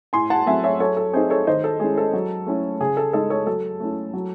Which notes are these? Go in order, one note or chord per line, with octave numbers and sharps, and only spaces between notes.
A2 G#5 C6
F#5 A5
F#3 A3 C4 E5 G#5
C#5 E5
F#3 A4 C#5
A4
C4 D#4 G#4 C5
A4 C#5
D#3 C5 D#5
A4
G#3 C#4 E4 G#4
A4
F#3
A3 C#4 E4
C#3 G#4
A4
G#3 D#4 A4
A4 C#5
F#3 A4
A3 C#4 E4
F#3